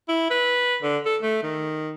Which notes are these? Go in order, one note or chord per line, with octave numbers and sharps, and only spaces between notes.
E4
B4
D3
A4
A3
D#3